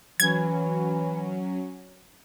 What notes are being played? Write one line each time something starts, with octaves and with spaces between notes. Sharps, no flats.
E3 F#3 C#4 G#6